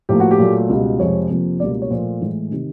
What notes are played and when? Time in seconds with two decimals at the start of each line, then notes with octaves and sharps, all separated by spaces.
0.09 A2 F3 A#3 G4
0.20 F#4
0.31 G4
0.39 A#2 F#3 A3
0.70 C#2 B2 G3
1.00 F2 C3 F3 G#3 C#5
1.30 F2 C3 F3 A#3
1.60 C#2 B2 G3 A#3 D5
1.82 C#5
1.90 A#2 F3 A3 C5
2.21 A2 E3 G#3
2.51 C3 D#3